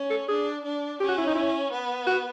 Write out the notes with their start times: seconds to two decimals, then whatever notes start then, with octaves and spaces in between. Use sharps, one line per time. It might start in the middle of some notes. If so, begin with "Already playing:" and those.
Already playing: C#4
0.10 A4
0.28 D4 G#4
0.64 D4
1.00 C#4 G4
1.09 F#4
1.18 E4
1.27 D#4
1.35 E4
1.72 B3
2.06 F#4